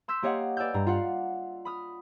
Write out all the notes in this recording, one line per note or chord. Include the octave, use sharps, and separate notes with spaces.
C6 E6 G6 B6
A#3 G4 C#5 D#5 F5 F#5
B4 D5 G#5 E6 F6 G6
G2 A#5
F4 F5 F#5
B5 D#6 F6